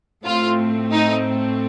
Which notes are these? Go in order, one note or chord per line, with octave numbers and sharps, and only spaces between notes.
A2 A3 C4 F4
D#4